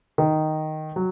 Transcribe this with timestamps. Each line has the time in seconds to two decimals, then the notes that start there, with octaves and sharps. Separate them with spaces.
0.18 D#3
0.96 F#3